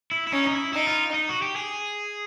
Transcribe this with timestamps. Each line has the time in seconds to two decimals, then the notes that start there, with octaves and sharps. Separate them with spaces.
0.11 E4
0.27 E4
0.32 C#4 D#4
0.47 D#4
0.53 E4
0.73 D#4 E4
0.88 F4
1.14 D#4
1.29 F#4
1.42 G4
1.56 G#4